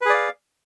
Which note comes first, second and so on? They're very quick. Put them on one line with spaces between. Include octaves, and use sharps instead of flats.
B4 G#4 D5 F5